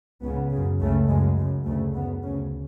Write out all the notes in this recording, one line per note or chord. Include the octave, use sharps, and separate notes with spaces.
C#2 C#3 B3
F#2 C#3
C#2 C#3 A3
F#2 C#3 G#3
F#2 C#3
D2 C#3 A3
F#2 C#3 B3
D2 C#3 C#4